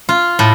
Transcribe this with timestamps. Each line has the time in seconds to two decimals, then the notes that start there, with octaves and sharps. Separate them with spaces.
0.09 F4
0.39 A2